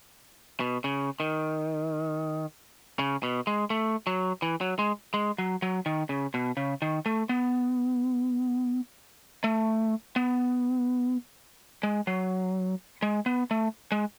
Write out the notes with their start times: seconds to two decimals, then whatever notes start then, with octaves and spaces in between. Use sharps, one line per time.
0.60 B2
0.84 C#3
1.20 D#3
2.99 C#3
3.23 B2
3.47 G#3
3.70 A3
4.07 F#3
4.42 E3
4.61 F#3
4.79 G#3
5.14 G#3
5.38 F#3
5.62 F#3
5.86 D#3
6.09 C#3
6.34 B2
6.57 C#3
6.82 D#3
7.06 A3
7.29 B3
9.44 A3
10.16 B3
11.83 G#3
12.07 F#3
13.02 G#3
13.26 B3
13.51 A3
13.92 G#3